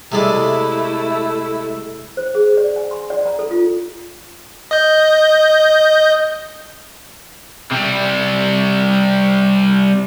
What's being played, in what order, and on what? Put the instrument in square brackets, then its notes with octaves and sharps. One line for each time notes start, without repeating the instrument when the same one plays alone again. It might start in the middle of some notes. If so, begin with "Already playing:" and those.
[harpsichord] C3 G#3 D5 [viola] A3 E4
[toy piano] C5
G#4
D5
G#5
C6
D5
A#5
A4
F4
[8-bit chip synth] D#5 G6
[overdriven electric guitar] C3 G3